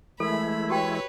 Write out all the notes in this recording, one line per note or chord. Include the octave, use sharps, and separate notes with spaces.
E3 G#3 A3 E4 A4 A#4 B5
F#4 G4 B4 C#5 G5